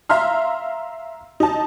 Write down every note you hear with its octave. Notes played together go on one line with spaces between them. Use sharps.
E5 F5 A#5 C6 F6
D#4 A5